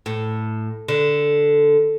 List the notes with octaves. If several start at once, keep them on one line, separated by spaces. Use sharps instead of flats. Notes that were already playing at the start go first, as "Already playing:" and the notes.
A2
D3